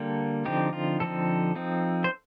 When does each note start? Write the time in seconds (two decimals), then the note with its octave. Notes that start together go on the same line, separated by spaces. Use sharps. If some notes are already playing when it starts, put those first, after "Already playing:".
Already playing: D3 G3 A#3 A4
0.45 D3 F3 C4 D#4 G4
0.73 F4
1.00 D3 F3 C4 D#4 A4
1.55 F3 C4 D#4
2.04 C5